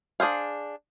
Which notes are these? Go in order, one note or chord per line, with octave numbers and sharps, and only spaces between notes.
D4 G#4 C5 F5